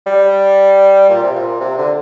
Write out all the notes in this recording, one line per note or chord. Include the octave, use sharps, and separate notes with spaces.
G3
A#2
C3
A#2
C3
D3